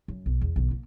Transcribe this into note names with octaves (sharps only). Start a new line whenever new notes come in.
F#2
B1
E2
B1 D#3
A#3